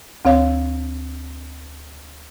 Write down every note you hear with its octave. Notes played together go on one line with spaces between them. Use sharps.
D2 C4 C#5 F5